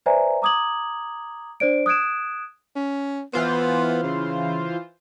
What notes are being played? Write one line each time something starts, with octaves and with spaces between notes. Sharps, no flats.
B4 C5 D5 E5 G#5 A#5
A#5 D6 D#6 G#6 F#7
D4 C5 D5 D7
D#6 F#6 G#6 D7 E7
C#4
E3 B3 F4 C5
C#3